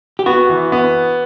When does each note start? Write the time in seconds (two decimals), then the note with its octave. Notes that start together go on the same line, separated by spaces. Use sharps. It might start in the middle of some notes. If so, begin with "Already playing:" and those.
0.19 G4
0.26 B3 F#4
0.49 E3
0.72 B3